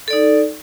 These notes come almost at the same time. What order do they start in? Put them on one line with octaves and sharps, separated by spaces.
A4 D5 D#4